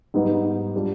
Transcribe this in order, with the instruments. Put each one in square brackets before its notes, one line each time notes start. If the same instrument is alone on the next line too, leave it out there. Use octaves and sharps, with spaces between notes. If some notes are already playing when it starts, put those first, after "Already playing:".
[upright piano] G#2 G3 B3 D#4
G3 D4 F4